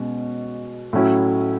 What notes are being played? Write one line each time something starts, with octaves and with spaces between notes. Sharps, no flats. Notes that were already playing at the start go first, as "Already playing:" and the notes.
Already playing: B2 G#3 C#4
A2 F#3 C#4 E4